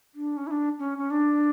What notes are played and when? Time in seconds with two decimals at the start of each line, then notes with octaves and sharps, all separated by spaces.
0.15 D4
0.37 C#4
0.47 E4
0.51 D4
0.79 C#4
0.98 C#4
1.10 D4